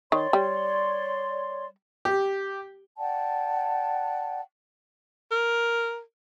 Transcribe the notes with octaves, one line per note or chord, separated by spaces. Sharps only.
D#3 C#5 D5 C6
G3
G4
D5 F#5 G5 A5
A#4